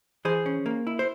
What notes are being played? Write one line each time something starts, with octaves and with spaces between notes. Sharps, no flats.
E3 G#4 C5
C#4
A#3
E4
C5